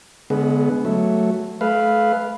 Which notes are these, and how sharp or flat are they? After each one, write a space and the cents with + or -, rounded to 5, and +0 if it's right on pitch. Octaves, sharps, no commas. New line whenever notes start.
D3 -30 G#3 +15 B3 +0
F#3 +0 A3 +0
A3 -35 B4 +0 F5 +0